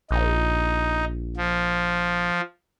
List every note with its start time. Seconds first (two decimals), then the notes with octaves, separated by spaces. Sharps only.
0.11 A#1 D#4
1.37 F3